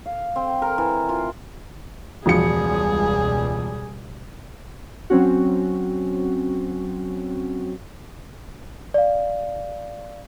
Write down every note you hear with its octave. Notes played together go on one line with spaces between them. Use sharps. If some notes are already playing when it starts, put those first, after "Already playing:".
F5
C4
A#4
E3
F4
E1 C#2 B2 F3 G3 G#4 C#7
F#3 C4 C#4 F#4
D5 F5